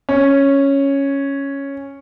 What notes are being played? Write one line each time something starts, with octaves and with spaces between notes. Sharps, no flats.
C#4